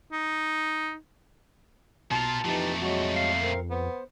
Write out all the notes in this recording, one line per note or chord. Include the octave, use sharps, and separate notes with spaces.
D#4
B1 A#2 F4 A5
F2 A#2 E3 A3 D#4 G4
F#3 G#3 F#4
F5
C4 A#4
B3 C5